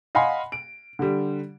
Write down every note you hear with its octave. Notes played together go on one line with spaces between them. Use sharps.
D#5 F5 F#5 G#5 B5 C6
D7
D3 G3